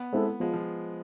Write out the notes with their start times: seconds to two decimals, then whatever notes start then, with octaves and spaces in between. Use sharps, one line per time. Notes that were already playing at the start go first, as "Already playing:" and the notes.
Already playing: B3
0.13 G#3 C4 E4 A4
0.40 F3 G#3
0.54 F3